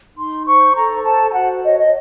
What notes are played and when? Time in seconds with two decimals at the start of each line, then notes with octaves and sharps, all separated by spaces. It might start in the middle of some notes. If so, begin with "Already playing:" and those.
0.17 D#4 C6
0.46 C5 C#6
0.76 A4 A#5
1.04 C5 A5
1.29 A5
1.34 F#4 F#5
1.64 C#5 D#5
1.78 D#5